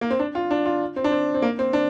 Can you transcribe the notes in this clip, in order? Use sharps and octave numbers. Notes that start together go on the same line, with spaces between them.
A#3
C4
D4
F4
D4
F4
C4
D4
C4
C4
A#3
C4
D4